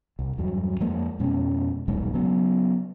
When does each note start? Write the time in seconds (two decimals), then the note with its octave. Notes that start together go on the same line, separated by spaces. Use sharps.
0.19 C2
0.38 E2 G2 F#3
0.80 F2 F3 G#3 A#3
1.19 F2 B2 G#3 C#4
1.88 D#1 B1 G#2 G#3
2.13 C#3 F#3 B3